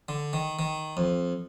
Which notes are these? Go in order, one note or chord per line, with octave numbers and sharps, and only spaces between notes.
D3
D#3
D#3
F2